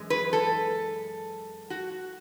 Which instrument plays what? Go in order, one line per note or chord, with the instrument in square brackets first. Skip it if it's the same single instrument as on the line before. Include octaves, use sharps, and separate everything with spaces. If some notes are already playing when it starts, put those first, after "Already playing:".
Already playing: [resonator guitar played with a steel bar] F#2 E3 G#3
B4
A4
F#4